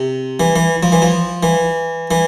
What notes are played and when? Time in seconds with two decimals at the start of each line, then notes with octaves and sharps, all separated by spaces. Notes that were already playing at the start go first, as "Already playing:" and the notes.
Already playing: C3
0.40 E3
0.56 E3
0.83 F3
0.92 E3
1.02 F3
1.43 E3
2.11 E3